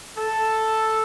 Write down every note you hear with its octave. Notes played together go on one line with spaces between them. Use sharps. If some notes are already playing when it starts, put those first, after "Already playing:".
A4